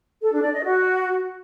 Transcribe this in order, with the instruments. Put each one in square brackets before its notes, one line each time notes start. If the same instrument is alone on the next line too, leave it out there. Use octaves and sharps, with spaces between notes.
[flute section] A4
D4
D5
D#5
F#4